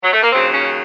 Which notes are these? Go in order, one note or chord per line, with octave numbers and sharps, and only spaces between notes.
F#3
A3
A#3
D#2 C#3 F#3 C4
C#4